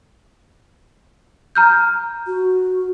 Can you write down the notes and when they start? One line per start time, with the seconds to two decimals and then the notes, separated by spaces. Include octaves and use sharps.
1.55 A#5 F6 G6
2.27 F#4